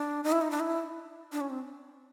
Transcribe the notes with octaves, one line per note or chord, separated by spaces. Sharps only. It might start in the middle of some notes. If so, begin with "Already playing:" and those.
Already playing: D4
D#4
E4
D#4
D4
E4
D4
C#4
C4